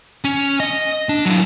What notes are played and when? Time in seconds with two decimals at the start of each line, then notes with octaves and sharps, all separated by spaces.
0.24 C#4
0.60 D#5
1.09 D4
1.25 F#3 E4